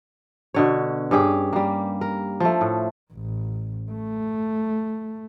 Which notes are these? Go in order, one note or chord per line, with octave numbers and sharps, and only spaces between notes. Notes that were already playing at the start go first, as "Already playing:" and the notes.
B2 D3 C#5
G2 C#4 G4 G#4
G3 A#3
A#4
F3 A3
A2
A1
A3